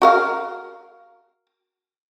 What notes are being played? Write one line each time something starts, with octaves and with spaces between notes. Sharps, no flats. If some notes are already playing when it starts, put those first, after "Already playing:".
F#4 A#4 F5